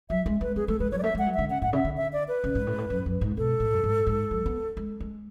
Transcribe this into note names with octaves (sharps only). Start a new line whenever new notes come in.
F#3 E5
G#3
A3 B4
B3 G#4
A3 A4
G#3 B4
F#3 C#5
D5
A3 E5
G#3 F#5
F#3
D3 E5
C#3 F#5
A2 F#5
C#3 E5
D3
E5
D5
B4
C#3
G#2
A2
G#2
A2
F#2
F#2
G#2
B2 A4
A2
F#2
G#2
G#2
F#3
B3
G#3
G#3